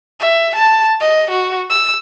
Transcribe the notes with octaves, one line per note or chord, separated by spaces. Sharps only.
E5
A5
D#5
F#4
E6